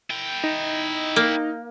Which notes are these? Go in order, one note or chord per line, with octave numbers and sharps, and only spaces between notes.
E4 G5
D#4
A#3